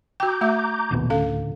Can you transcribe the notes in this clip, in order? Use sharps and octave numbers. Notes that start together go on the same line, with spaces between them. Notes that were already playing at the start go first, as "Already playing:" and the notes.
F#4 G5 A#5 D6 G6
A3 F#4 E5
A#1 D#2 B2
D2 A2 D3 C#4 A4 F5